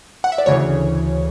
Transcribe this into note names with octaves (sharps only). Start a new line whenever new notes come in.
F#5
E5
D5
D2 C#3 E3 C#5